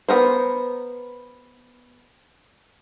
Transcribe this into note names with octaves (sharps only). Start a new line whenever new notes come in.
B3 A#4 C5